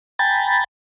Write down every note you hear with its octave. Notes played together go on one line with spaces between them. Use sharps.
G5 G#5 A#5 B5 A6